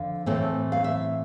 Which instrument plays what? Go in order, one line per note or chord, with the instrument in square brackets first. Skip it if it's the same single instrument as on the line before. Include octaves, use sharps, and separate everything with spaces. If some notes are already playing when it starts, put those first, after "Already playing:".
Already playing: [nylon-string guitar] F2 D3 F5
A2 E3 A3 C4
F5
E5